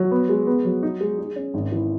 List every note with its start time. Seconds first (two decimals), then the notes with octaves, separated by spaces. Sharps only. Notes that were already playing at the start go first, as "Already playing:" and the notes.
Already playing: F#3
0.11 B3
0.29 G#3
0.47 B3
0.65 F#3
0.83 D#4
1.01 G#3
1.19 G#4
1.36 C#4
1.54 G#1
1.72 E3